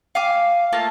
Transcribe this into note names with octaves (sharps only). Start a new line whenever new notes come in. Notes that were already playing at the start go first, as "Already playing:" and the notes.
F5 G#5 D6
A3 A#3 F4 A5